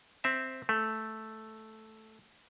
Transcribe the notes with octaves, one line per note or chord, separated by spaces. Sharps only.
C4 E5
A3